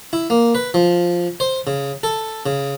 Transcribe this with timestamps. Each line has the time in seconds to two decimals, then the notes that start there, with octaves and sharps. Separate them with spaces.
0.13 E4
0.30 A#3
0.55 B4
0.74 F3
1.40 C5
1.67 C#3
2.03 A4
2.46 C#3